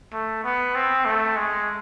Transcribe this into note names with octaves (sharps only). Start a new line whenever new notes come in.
A3
B3
C4
A3
G#3